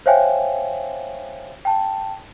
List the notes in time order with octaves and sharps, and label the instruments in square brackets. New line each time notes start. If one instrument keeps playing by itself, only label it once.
[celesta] C5 C#5 E5 F5 G5 G#5
G5 A5